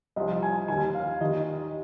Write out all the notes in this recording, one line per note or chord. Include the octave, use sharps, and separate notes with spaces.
C2 C3 F3 D#5
G#5
D#2 D#3 G#5
F5
D#2 D#3 D#5